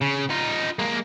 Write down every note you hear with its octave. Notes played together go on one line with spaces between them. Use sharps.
C#3
D#4 F4
G#3 A#3